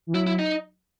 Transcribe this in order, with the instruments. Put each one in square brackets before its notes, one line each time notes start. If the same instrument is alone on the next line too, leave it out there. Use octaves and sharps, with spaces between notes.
[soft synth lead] E3
[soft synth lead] F#3 [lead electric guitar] E4
[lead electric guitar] E4
D#4